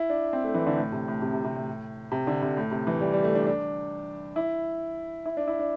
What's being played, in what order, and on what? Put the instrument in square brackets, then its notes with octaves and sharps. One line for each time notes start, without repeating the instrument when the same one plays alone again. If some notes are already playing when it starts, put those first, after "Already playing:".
Already playing: [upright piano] E4
D4
C4
A3
E3
D3
A2
C3
A2
C3
C3
C3
A2
C3
D3
C3
A2
C3
E3
G3
G3
A3
D4
D4
E4
E4
D4
E4
D4